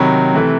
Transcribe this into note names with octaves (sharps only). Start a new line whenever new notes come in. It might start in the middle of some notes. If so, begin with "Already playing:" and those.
Already playing: C3 D#3 F#3 B5 C#6
C3 E3 A3